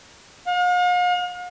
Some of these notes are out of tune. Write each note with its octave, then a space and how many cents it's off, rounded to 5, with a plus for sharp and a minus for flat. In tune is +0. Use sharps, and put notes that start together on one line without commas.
F5 +45